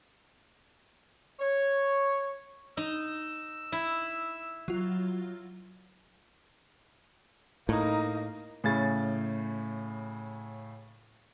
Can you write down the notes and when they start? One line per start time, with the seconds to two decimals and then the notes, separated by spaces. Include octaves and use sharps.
1.40 C#5
2.77 D#4 E6
3.72 E4
4.68 F#3 F4
7.69 A2 A#3 D#4
8.64 A2 C#3 A6